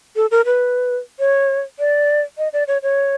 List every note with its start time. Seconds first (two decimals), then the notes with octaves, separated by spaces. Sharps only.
0.16 A4
0.31 A#4
0.45 B4
1.19 C#5
1.79 D5
2.38 D#5
2.53 D5
2.68 C#5
2.83 C#5